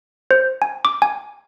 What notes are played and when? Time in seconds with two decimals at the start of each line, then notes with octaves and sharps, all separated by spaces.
0.31 C5
0.62 G#5
0.85 D6
1.02 G#5